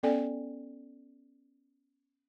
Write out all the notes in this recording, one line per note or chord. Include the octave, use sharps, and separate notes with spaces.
B3 C#4 A4 D5 G5 G#5